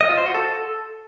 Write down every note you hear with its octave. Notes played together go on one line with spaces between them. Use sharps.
D#5
F4
C5
F#4
A4